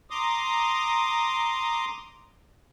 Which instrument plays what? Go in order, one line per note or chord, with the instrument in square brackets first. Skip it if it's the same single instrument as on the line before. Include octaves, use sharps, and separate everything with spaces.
[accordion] A#5 C6 D6 D#6